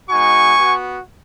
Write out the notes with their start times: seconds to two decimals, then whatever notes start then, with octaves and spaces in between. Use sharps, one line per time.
0.09 G#3 B3 D#4 F#4 G#5 C#6
0.56 B3
0.61 F#4